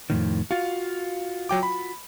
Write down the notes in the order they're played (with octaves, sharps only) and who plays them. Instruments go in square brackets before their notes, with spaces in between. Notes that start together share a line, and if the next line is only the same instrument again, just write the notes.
[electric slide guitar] F2 A2 D#3
[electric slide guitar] F4 F#4 [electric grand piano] F5
[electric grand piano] F#3 G5 D6
B5